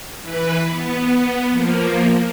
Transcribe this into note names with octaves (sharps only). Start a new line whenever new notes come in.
E3 B4
B3
F3 A#3